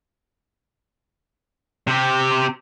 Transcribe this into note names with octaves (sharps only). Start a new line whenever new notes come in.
C3 G4